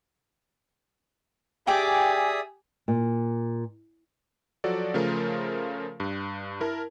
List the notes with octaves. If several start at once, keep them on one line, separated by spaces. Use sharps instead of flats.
G4 G#4 D5 E5 G5 G#5 D#6
A#2
F3 F#3 F#4 A4 D5
C#3 F3 A3 F4 A#4
G2
E4 A#4 A5